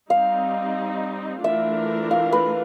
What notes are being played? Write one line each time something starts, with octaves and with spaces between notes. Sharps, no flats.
G3 C4 D#4 F5
E3 A3 D4 F4 A#4 E5
F5
B4